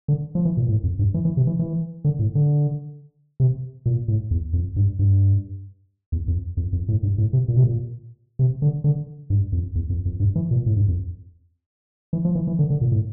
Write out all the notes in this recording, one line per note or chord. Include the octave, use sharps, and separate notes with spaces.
D3
F3
E3
A#2
A2
F2
G2
E3
E3
C3
E3
E3
D3
A2
D3
C3
A#2
A2
E2
F2
G2
G2
E2
F2
F2
F2
A2
G2
A2
C3
A#2
C3
A#2
C3
D3
D3
G2
F2
E2
F2
F2
G2
E3
A#2
A2
G2
F2
E3
F3
E3
E3
D3
D3
A#2
A2